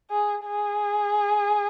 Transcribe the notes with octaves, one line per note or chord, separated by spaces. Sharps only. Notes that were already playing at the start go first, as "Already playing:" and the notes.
G#4
G#4